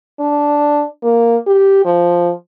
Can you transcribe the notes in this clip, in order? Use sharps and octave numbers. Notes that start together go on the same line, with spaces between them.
D4
A#3
G4
F3